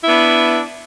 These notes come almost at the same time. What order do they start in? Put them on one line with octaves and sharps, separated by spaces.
E4 D4 B3